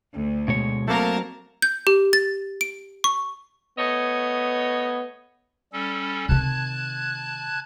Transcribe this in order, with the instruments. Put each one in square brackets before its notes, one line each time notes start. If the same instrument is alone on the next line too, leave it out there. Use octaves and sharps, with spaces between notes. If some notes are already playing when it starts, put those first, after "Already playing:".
[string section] D2
[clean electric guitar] B2 G#3 C#5
[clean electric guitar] F#3 C4 [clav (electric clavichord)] A3 A#3 [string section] A#4 A5
[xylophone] G6
G4
A6
D7
C#6
[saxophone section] A3 C#5 D#5 [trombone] B3
[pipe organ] G3 C#4 A4
[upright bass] C3 D#3 [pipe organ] A5 F#6 G#6